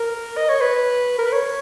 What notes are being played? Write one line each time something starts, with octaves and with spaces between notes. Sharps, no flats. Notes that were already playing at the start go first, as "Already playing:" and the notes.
Already playing: A#4
D#5
C#5
B4
A#4
B4
C#5